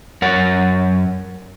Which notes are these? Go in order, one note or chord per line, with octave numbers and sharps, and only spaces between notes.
F#2 A#4 C#5 F#5